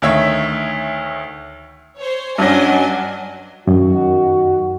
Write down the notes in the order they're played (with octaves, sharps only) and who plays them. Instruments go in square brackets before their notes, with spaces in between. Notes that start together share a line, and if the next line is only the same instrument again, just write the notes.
[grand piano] D2 D#3 C#5 E5 G#6 B6
[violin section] C5 C#5
[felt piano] G2 C#4 A#6 [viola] F#3 [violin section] D5 D#5 G#5
[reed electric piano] F#2 [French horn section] D#3 F#4